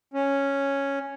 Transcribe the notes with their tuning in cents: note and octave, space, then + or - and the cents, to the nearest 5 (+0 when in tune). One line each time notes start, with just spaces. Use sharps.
C#4 +0